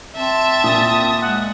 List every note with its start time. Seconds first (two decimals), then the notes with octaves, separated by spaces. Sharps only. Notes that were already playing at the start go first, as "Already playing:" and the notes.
0.16 C4 E5 A5
0.64 A#2 D#6
1.22 G#3 F#5